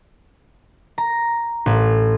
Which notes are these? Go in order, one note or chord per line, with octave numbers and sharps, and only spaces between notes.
A#5
A1